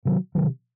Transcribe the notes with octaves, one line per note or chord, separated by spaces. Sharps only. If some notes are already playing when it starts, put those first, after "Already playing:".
C3 D#3 F#3
C3 D#3 F#3